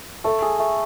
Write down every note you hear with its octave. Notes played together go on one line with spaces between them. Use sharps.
A3 A4
G#4
A3